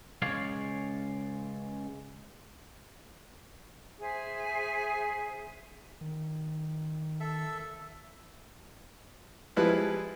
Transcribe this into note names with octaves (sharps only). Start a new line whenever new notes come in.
C#2 C#3 G#3 C#5 D5 F5
G#4 C5 E5 G#5
D#3
A4 E5
F3 G3 G#3 E4 B4